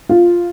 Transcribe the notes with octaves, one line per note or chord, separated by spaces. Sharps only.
F4